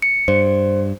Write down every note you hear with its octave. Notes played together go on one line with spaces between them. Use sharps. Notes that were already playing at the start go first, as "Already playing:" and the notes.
C#7
G2 C5